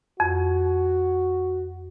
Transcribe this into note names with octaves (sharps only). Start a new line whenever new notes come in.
F2 F#4